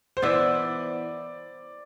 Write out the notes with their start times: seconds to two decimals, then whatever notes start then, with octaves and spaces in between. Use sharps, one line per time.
0.17 C5
0.22 E3 B3 E4 D5